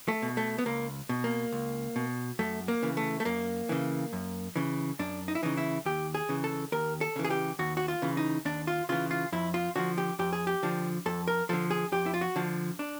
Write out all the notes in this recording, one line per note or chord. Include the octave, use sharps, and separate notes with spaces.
A3
B2
A3
B3
C#2 A#3
B2
A#3
C#2
B2
F#2 A3
A#3
C#3 E3
A3
A3
F#2 A#3
C#3 E3
F#2
C#3 E3
F#2 D4
D#4
E4
C#3 E3 D#4
E4
D#2 G4
G#4
C#3 E3
A4
D#2 A#4
A4
C#3 E3
G#4
G4
D#2 F#4
F#4
F4
C#3 E3
D#4
D#2 D4
F4
C#3 E3 F4
F4
F2 E4
F4
D3 F3 F#4
G4
F2 G4
G#4
G4
D3 F3
F2 A4
A#4
D3 F3 A4
G#4
F2 G4
E4
F4
F#4
D3 F3
D4